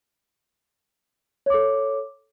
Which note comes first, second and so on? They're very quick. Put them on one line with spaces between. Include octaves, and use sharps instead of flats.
C#5 D6 A4